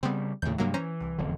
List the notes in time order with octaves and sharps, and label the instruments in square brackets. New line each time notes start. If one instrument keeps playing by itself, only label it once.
[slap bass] C#3 G3 [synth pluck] B3 C4
[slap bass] D#2 A2 [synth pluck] C#3 G6
[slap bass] G2 C3 [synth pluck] F#3 A#3
[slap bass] E3 [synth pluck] C#4 C5 A#5
[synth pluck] C2
[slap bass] E1 F2 D3